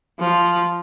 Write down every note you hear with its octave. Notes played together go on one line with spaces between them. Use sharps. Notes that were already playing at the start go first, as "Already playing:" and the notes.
F3